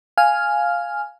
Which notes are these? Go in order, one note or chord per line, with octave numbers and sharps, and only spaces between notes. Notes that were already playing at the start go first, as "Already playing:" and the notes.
F5 G#5 F6